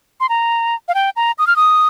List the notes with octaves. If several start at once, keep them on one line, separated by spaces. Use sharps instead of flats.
C6
A#5
F5
G5
A#5
D#6
F6
D#6